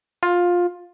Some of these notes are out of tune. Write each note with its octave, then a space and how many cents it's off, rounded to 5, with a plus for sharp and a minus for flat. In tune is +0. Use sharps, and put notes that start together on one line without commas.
F4 +15